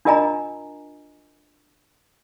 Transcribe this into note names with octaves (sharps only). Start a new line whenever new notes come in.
D4 F4 A#4 D#5 G#5 A#5